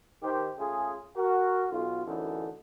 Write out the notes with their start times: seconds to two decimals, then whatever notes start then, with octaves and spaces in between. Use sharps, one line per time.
0.23 D#3 G4 C5
0.58 C#3 A3 F4 G#4
1.16 F#4 A#4
1.71 B1 F4
2.06 A1 F#2 D3 E3 D#4 A4